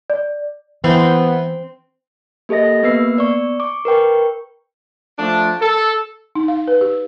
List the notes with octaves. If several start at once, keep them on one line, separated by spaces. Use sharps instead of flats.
D5
E3 B3 C4 E4 G5 G#5
A#3 G4 A4 D#5 A#6
A#3 B3 B4 E6 C7
B3 D5 C#6
C#6 D6
A#4 B4 G5 C#6
F3 A3 D4
A4
D#4
F5
B4
G4